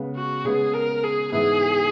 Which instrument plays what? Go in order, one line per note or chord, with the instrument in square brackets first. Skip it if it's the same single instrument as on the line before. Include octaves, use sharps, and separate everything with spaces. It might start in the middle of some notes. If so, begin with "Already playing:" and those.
Already playing: [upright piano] C#3 G#3 B3
[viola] F#4
[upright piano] C#3 G#3 B3 [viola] G#4
[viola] A#4
G#4
[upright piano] G#2 E3 B3 E4 [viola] G#4